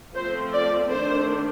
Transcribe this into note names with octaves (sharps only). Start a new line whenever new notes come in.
F3 A3 C4 C5
D5
D#3 A3 D4 C5